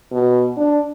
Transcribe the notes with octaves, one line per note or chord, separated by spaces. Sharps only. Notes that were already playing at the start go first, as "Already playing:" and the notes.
B2
D4